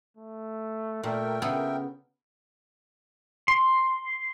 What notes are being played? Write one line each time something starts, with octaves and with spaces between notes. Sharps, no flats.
A3
A#2 A3 A#4 G5
C#3 B3 A4 E5
C6